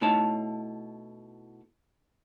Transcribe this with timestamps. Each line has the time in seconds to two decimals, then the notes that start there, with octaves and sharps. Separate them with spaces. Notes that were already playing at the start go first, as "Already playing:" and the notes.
0.01 B2 A3 D#4 E4 C#5 A5